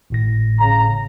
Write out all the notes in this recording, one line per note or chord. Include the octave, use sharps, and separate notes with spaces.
G#1 A2 A#6
C#3 A#5